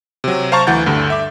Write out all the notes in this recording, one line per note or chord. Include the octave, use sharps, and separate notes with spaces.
C3 F#3
C5 F5 A5 A#5 C#6 A6
D2 E3 F#5 G6 A6
D2 G2 D3
E5 D6